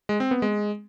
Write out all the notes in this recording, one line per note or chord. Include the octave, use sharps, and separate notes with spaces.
G#3
C4
B3
G#3